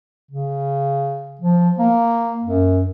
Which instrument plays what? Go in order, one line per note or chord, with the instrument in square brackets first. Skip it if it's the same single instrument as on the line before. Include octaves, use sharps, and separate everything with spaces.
[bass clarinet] C#3
F3
A#3
F#2